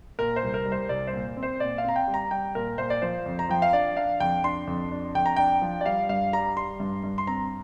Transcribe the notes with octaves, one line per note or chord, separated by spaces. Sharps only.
A#2 A#4
C5
C2
A#4
G3
C5
C2 D5
C5
A#2
C4
C5
A#2 D5
F5
C4 A#5
G5
G3
A#5
G3 G5
A#2 A#4
A#2 C5
D5
F3 C5
F2
A#5
F3 G5
F5
D4 D5
D4 F5
F2 G5
D4 C6
F2
D4
F2 G5
A#5
D4 G5
F3
D5
G3 F5
G2 F5
G3 A#5
G3 C6
G2
G2
C6
C4 A#5